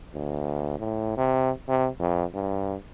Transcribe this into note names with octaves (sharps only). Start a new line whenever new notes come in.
D2
A2
C3
C3
F2
G2